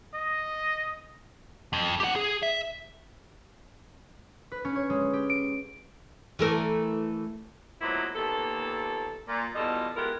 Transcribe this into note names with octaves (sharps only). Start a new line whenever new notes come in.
D#5
F2
G4 F#5
G#4
E5
B4
C#4
C#5
G#3
G4
D7
E3 A3 A#4
F3 F#3 G#3 A#3 B3 E4
D#2 A#2 B3 A4
A#2 A#3
E2 B2 G3 F4 A4 D#5
G#3 B3 E4 F4 G4 A#4